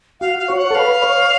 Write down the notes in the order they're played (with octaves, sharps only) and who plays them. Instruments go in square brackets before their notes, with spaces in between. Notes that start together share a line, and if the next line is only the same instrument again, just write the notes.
[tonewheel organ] F#4 [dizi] F5
[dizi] F5
[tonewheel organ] C#5
[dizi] F#5
[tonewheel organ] A4
[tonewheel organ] B4 [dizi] F5
[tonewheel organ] C#5